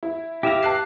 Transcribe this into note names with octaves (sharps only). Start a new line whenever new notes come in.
E4
E4 G4 E5 F5 A#6
A5 F#6 C7